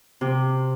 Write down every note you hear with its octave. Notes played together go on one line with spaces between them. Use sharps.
C3